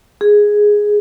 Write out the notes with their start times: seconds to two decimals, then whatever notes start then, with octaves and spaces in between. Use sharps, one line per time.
0.21 G#4